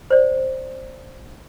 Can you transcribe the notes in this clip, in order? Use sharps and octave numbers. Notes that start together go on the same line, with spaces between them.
C5 D5